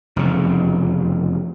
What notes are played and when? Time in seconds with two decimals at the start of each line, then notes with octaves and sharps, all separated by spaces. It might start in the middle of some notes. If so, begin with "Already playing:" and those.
0.16 F1 E2 C#3